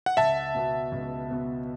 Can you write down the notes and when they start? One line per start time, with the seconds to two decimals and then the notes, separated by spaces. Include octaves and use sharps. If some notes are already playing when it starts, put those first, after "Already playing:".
0.06 F#5
0.17 C#2 E5 A5
0.54 B2 B3 F#4
0.92 C#2
1.30 B2 B3 F#4